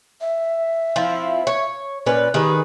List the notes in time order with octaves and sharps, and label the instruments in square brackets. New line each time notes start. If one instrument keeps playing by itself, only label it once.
[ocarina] E5
[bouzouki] F3 C4 E4
C#5
[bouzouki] A#2 C#4 B4 [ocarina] D5
[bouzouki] D#3 G#4 B4 [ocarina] G4